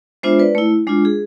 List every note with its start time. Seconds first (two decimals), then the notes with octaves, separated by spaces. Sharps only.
0.23 G#3 B3 D4 F4 C5 E5
0.39 B4 D5
0.55 A3 E4
0.87 G#3 D4 F4
1.05 G#4